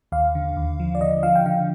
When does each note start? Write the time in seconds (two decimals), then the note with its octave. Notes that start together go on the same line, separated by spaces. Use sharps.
0.12 D#2 F5
0.35 D3
0.57 D#2
0.80 F3
0.95 D5
1.01 D3 D#5
1.23 F3 F5
1.35 G5
1.46 D3 F5